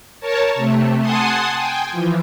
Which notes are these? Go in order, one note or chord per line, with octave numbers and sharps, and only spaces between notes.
A#4 C#5 A5
C3 A3
F#5 G#5 A5 C6 D#6
G5 G#5
E3 F3